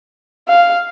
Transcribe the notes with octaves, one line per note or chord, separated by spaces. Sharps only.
F5